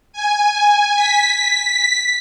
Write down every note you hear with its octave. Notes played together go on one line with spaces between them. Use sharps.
G#5
B6